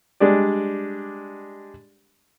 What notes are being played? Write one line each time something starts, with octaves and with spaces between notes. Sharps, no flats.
G3 G#3 D4 G4 D5